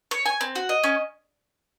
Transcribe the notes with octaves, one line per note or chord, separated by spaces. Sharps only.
C#5
G#5
C4
F#4
D#5
C#4